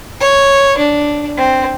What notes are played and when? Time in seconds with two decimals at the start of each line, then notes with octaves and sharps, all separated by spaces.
0.21 C#5
0.78 D4
1.38 C4